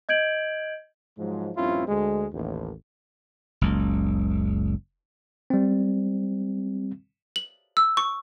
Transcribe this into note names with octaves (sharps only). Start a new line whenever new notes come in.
D#5 G6 G#6 D7 F#7
G#2 F3 F#3 G#3
A#1 G2 C4 C#4 E4 F4
D2 G#3
A1 D#2
F#1 C#2
G3 C4
F#7
E6
C#6